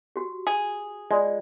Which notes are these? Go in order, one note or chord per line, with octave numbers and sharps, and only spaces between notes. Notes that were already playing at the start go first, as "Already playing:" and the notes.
F#4 G4
G#4
G#3 F4 D5